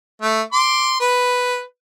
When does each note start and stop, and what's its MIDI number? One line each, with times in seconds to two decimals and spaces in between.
0.22 0.41 57
0.53 0.97 84
0.53 0.97 86
1.00 1.62 71